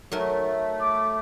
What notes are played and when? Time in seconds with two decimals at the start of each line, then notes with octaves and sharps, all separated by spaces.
0.12 F#3 A3 D#4 A#4
0.81 D6